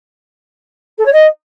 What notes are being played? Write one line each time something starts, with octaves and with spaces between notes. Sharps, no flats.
A4
C#5
D#5